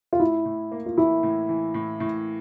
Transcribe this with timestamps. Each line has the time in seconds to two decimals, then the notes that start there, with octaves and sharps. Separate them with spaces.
0.13 F4
0.19 A2 E4
0.45 A2
0.72 A#3
0.86 F4
0.97 E3 E4
1.23 A2
1.49 E3
1.74 A2
2.00 A2